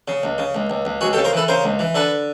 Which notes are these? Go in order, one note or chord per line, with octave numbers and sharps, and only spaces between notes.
C#3
C#2
C#3
C#2
C#2
C#2
C#2 F#4 G#4
G4 A4
C#3
A#4 C5
E3 A4 B4
C#3 A#4 C5
C#2
E3
D3 A4 B4